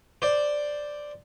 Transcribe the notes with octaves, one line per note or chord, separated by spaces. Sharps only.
C5 D5